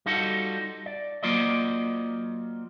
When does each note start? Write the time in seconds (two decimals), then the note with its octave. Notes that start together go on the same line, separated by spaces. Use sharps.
0.06 G3 D#4 F4 F#4 A4
0.86 D5
1.23 F#3 A#3 F4 C5 D5 D#5